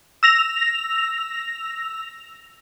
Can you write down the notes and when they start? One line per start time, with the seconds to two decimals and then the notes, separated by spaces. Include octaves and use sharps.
0.23 E6 A#6 F7